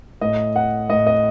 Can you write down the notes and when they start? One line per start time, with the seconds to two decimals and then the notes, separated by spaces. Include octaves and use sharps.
0.21 A2 D#5
0.56 F#5
0.90 A2 D#5
1.07 D#5